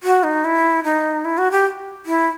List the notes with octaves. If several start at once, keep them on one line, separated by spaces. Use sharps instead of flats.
F#4
D#4
E4
D#4
E4
F#4
G4
E4